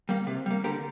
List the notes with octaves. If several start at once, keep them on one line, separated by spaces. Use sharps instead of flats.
G3 A#3
C3
G3 A#3
D3 G4 A#4